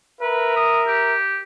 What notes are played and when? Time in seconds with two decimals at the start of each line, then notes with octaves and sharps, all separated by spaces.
0.21 A#4 B4 E5
0.56 D#6
0.87 G4